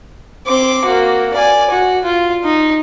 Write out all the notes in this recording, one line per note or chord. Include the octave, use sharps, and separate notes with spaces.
C4 D6
A#3 F#4
D5 G#5
F#4
F4
D#4